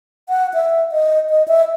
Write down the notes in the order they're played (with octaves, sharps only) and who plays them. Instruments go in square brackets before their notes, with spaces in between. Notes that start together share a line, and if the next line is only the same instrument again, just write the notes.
[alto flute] F#5
E5
D#5
D#5
E5